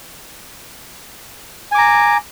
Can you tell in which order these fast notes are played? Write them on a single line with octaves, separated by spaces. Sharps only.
G#5 D6 A#5